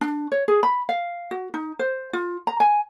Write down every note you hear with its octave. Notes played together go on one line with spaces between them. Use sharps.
D4
C#5
G#4
B5
F5
F#4
D#4
C5
F4
A#5
G#5